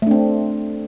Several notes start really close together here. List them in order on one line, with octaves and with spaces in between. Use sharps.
A3 D4 C4